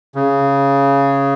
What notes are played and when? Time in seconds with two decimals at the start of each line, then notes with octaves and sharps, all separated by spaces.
0.15 C#3